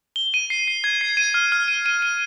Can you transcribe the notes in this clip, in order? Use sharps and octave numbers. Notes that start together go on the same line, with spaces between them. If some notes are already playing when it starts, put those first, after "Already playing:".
G7
D#7
C7
C7
G#6
C7
D#7
F6
F6
D#7
D#7
D#7